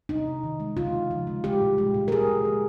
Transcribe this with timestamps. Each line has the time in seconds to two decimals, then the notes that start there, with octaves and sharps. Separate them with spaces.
0.09 C3 D#4
0.27 C3
0.43 D#3
0.60 G#3
0.77 C#3 F4
0.94 C#3
1.11 F3
1.27 G#3
1.44 G#3 G4
1.62 A#2
1.78 G#3
1.94 A#2
2.08 A#4
2.11 G#3 G#4
2.28 A#2
2.45 G#3